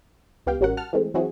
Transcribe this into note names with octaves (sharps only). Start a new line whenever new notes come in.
C#2 B3 G4 F5 G5
A1 G3 C#4 F#4 A#4 F#5
F#5 A5 F6
E3 G#3 A3 C4
E3 F#3 C4 E4 F#4 G#4